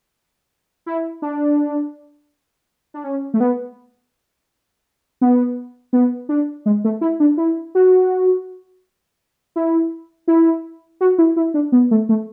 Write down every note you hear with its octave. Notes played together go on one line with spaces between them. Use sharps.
E4
D4
D4
C#4
A3
B3
B3
B3
D4
G#3
A3
E4
D4
E4
F#4
E4
E4
F#4
E4
E4
D4
B3
A3
A3